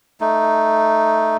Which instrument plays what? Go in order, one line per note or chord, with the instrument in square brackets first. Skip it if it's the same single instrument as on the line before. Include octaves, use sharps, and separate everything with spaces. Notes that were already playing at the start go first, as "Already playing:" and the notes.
[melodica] A3 D#4